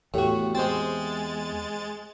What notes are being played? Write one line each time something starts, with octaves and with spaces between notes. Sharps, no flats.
E2 A2 F#4 G4 G5
G#3 C4 C5 A6